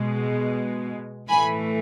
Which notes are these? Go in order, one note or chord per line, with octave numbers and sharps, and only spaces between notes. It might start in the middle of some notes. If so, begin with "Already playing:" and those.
Already playing: B2 G#3
A2 E3 A3 G#5 B5